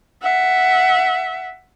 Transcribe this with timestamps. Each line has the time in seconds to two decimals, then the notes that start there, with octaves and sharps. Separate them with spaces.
0.22 E5 F#5